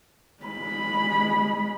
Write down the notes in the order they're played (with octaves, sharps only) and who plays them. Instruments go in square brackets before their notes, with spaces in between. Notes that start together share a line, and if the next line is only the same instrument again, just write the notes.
[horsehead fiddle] G#3 B5